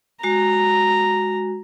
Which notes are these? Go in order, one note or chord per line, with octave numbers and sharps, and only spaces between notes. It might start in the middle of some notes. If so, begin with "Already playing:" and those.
G#3 F#4 A#5